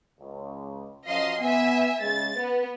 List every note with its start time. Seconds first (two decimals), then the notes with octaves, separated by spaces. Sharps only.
0.20 C#2
1.07 F#2 F3 D#5 F5 C6
1.40 B3 E5 G#5
2.01 C#3 G#3 A6
2.37 B3 B4